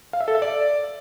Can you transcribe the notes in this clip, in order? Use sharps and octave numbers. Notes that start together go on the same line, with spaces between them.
F5
E5
A4
E5
D5